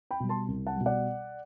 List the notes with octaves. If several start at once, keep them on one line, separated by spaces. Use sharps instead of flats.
G5 B5
B2 G3
A5 C6
C2
F#5 A5
B2 G3
D5 F#5